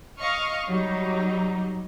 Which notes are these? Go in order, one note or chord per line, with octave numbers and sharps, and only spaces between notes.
D#5 F5 C#6 F6
F#3 G3 D#4